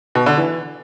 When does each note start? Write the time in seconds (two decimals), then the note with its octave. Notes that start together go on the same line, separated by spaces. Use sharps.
0.15 B2
0.26 D3
0.37 E3